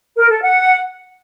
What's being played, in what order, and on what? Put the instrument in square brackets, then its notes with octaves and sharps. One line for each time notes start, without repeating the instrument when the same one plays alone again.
[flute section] A#4
A4
F#5